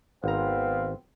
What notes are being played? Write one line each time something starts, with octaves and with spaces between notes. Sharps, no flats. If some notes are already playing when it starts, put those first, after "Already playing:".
G#1 B3 C4 F5 A#5